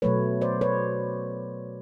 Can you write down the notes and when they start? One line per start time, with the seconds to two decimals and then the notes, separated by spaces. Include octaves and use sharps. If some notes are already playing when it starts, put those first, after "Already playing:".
0.02 B2 F#3 A3 B4 C#5
0.41 C5 D5
0.61 B4 C#5